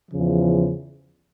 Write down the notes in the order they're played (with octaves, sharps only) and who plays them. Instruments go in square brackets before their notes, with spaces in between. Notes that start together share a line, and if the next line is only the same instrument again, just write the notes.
[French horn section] E2 C#3 F3